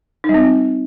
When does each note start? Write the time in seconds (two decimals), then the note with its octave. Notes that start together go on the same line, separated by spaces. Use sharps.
0.24 D#4
0.29 G3
0.34 C4